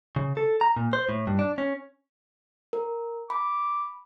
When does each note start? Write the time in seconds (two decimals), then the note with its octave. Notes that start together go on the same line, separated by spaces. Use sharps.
0.16 C#3
0.37 A4
0.61 A#5
0.76 A#2
0.93 C5
1.09 A2
1.27 G2
1.39 D4
1.58 C#4
2.73 A#4
3.30 B5 D6